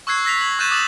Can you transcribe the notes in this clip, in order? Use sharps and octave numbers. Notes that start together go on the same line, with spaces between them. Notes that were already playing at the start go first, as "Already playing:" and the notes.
C#6 E6 F#6 G#6 C7
E6 A#6 B6 F7
F#7
C#6 F#6 G6 A6 D#7 E7
D6 D#6 A6 E7 F#7